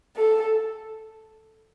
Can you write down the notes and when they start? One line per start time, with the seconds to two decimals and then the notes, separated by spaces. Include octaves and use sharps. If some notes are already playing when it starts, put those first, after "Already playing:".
0.16 A4